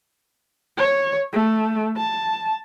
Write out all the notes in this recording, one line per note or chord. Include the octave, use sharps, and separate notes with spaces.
C#5
A3
A5